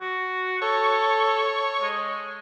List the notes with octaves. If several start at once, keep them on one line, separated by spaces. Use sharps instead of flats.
F#4
A4 C#5
G#3